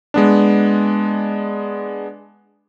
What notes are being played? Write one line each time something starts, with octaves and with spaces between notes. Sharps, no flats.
G#3 B3 D4